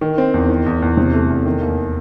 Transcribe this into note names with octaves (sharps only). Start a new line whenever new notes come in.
D#3
C4
E2
D#3
E2
E2
C3
A3
E2
D#3
D#2